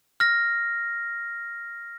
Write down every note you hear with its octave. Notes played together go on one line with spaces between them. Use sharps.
F6 A#6